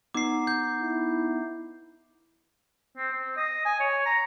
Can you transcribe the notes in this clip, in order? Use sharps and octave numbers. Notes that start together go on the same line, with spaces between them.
B3 D#4 D6 C7
G6
E4
C4
C4
D#5
G#5
C#5
A#5